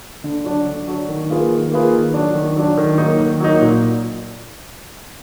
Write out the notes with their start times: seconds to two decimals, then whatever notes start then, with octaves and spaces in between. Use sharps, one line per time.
0.24 D3
0.44 F#3 D4
0.66 D3
0.87 F#3 D4
1.09 D#3
1.30 A#3 F4 G#4 B4
1.51 D#3
1.72 A#3 F4 G#4 B4
1.93 D#3
2.14 F#3 D4
2.35 D#3
2.56 F#3 D4
2.77 D#3
2.98 F#3 A#3 D#4
3.20 D#3
3.40 F#3 A#3 D#4
3.62 A#2